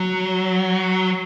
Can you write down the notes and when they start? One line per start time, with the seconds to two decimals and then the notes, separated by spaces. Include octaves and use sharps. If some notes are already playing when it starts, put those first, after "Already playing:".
Already playing: F#3